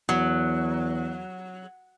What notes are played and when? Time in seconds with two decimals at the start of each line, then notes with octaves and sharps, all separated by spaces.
0.09 E2 F#3